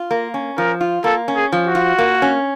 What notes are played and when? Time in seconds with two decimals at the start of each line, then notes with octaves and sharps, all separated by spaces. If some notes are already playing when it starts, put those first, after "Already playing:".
Already playing: F4
0.11 A#3
0.34 C#4
0.58 F3 A#4
0.81 F4
1.04 A#3 A4
1.28 C#4
1.36 G#4
1.52 F3
1.67 F#4
1.75 F4
1.98 A#3
2.22 C#4